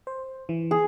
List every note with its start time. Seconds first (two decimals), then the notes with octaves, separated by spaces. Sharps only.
0.07 C5
0.49 E3
0.71 G#4